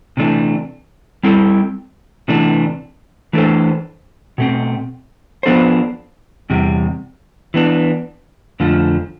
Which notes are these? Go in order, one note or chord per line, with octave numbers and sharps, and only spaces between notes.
C3 E3 A3 D4
G3 C4 E4 A4
C3 E3 A3 D4
E3 A3 D4 A4 C5
B2 A3 C4
F3 B3 D4 A4 C5
E2 C3 G3
E3 B3 D4
F2 D3 F3 A3